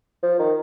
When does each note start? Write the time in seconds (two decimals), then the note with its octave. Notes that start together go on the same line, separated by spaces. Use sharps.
0.23 F3
0.39 D#3